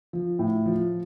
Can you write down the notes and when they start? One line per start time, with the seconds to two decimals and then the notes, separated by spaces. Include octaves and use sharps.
0.13 F3
0.39 A2
0.66 F3